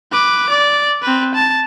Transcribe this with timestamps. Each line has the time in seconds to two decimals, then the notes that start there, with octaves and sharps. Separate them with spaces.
0.12 B4 D6
0.50 D5
1.02 C4 B4
1.35 A5